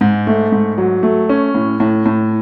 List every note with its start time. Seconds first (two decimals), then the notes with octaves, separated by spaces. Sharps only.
0.01 G#2
0.27 A3
0.52 G#2
0.78 F#3
1.03 A3
1.29 C#4
1.55 A2
1.80 A2
2.06 A2